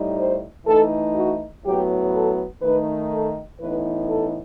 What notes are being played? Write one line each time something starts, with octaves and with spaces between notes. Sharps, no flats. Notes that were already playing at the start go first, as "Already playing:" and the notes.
Already playing: A2 G3 D#4
C5
E3 A3 D#4 A4
F#4
A2 F#3 B3 G4
A4
D#3 A3 D#4 B4
A4
A2 E3 B3 D#4 B4
A4